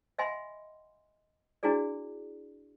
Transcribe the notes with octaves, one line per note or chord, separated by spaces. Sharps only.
D#5 E5 F#5 G#5 B5 C6
D4 E4 F#4 G#4 D5